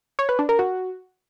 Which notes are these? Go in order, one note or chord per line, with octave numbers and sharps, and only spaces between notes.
C#5
B4
D4
A#4
F#4